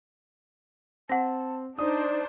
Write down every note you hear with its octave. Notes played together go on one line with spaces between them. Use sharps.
C4 F#5 A5 A#6
D4 D#4 C5 D5 D#6